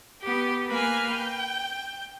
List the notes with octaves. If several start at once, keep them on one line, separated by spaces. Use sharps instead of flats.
B3 G4
A#3 B4 G#5 F6
G5